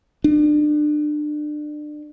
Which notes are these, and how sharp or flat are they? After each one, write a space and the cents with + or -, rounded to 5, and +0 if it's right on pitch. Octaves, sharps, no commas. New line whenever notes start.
D4 +30